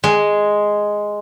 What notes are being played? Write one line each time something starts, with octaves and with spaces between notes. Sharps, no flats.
G#3